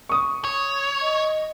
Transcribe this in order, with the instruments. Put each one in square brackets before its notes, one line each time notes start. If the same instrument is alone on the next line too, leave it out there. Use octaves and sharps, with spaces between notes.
[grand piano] C#6 D#6
[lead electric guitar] C#5
[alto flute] D#5